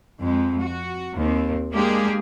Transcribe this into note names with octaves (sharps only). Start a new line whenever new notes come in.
F2 G#3
F#4
D#2 C4
G#3 A#3 D4 G4 G#4